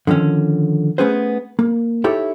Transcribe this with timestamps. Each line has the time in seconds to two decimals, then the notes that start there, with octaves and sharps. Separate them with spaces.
0.07 D3 D#3 F3 C#4
0.98 A3 B3 C#4 G#4 B4 C5
1.59 A#3
2.04 D#4 E4 G4 A4 C#5